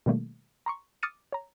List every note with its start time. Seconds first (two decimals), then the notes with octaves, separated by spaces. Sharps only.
0.06 B2 D#3 G3 A3 A#3
0.66 A#5 C6 C#6
1.03 D6 D#6 F6 A6 C#7 D#7
1.32 C#5 A#5